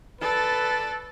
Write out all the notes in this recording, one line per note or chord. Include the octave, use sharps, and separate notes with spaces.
A4 B4 D5